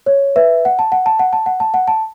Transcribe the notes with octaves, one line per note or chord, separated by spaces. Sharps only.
C#5
B4 E5
F#5
A5
F#5
A5
F#5
A5
F#5
A5
F#5
A5